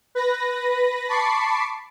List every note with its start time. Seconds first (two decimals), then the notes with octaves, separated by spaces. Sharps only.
0.15 B4 A#6
1.07 A5 B5 C#6 D6 C7